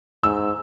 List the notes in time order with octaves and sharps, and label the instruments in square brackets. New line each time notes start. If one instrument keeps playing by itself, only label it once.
[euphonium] G#2 [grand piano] E6